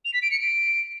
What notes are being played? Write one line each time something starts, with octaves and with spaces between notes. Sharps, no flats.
F7
B6
D7
C#7
D7